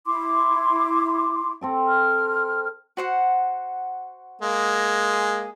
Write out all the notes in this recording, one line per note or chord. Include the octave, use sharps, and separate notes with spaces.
E4 C6 D6
C4 A4 D6
F6
F#4 C5 F#5
G#3 A#3
G#4